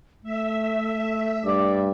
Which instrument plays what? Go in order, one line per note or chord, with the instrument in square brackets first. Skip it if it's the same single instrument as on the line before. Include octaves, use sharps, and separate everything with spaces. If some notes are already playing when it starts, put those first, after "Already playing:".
[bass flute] A3 [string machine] E5
[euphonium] G2 [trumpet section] D5